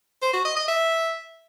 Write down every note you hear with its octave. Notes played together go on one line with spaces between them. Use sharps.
C5
F#4
D#5
D#5
E5